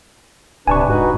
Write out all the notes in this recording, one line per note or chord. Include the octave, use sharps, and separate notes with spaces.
D1 C3 D4 B4 G#5 A5 C#6
G#2 D#4 F#4 B4